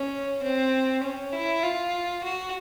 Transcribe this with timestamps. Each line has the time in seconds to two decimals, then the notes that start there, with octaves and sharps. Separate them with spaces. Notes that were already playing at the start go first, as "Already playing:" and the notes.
Already playing: C#4
0.42 C4
1.03 C#4
1.33 E4
1.63 F4
2.24 F#4